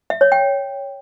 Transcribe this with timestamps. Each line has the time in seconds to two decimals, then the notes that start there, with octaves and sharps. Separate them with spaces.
0.10 E5
0.21 C#5
0.32 G5